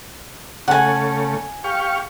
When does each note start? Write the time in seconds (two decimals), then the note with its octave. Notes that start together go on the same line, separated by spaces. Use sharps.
0.68 C#3 A3 F#5 G#5
1.64 G4 F5 C#6